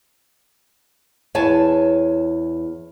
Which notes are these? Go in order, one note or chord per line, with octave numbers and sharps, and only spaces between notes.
E2 C#5 G#5 A5